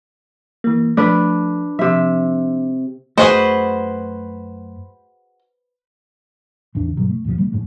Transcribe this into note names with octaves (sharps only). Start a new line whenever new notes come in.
E3 A#3
F3 A3 D4 B4
C3 F3 E5
F#2 A3 F#4 G#4 B4 C5 D#5
A1 E2 C#3 D4
G2 B2 F#3 G3
A3
D#2 A2 C3 F3
G3 A#3
F#2 A2 G#3 A3